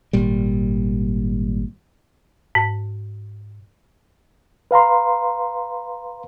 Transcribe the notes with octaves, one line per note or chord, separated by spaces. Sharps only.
G#1 A#2 G3
G#2
B4 F5 A#5 C6